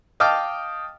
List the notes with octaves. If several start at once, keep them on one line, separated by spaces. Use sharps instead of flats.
D#5 F5 G5 A5 D6 F6